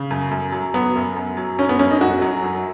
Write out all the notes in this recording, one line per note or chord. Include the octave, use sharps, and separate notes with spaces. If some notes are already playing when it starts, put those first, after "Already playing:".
Already playing: C#3
F#2
F#2
F#3
F#3 B3
F#2
F#2
F#3
F#2 C#4
B3
F#2 C#4
D#4
F#2 F#4
F#3
F#2